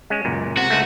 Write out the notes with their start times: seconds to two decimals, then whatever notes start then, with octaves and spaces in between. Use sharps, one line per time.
0.10 G#3 C#4
0.25 C#2 F#2 A#2
0.57 C3 F#4
0.70 C#2 G#3 A3